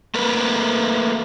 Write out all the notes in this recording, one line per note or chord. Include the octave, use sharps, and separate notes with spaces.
A3 A#3 A#4 B4